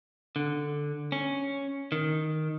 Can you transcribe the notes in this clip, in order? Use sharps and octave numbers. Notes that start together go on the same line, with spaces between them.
D3
C#4
D#3